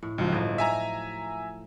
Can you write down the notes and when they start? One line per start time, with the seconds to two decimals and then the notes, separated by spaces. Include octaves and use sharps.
0.03 A2
0.18 C#2 F3 F#3 D#4
0.32 G1 A2 D#5
0.58 E5 G#5 A#5